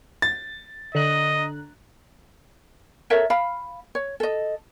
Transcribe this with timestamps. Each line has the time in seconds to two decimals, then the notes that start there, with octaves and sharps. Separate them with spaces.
0.22 A6
0.95 D3 D#5 A#5 F#6
3.10 A4 A#4 C#5 E5
3.30 F5 B5
3.95 C#5
4.20 A4 D#5